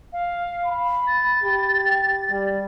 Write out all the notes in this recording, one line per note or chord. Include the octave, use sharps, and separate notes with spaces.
F5
B5
A6
G4
G3